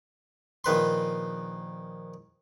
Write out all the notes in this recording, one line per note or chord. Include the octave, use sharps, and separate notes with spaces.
A#1 D#3 B4 C6